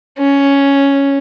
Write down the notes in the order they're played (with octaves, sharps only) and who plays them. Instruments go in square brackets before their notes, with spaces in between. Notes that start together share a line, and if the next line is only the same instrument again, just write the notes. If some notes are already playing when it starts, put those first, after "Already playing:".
[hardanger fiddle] C#4